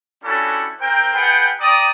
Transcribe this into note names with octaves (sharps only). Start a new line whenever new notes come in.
G3 C#4 D4 E4 F#4 A4
C4 A#4 C5 G5
F4 G#4 B4 F#5 G5
D5 G5 A#5 D#6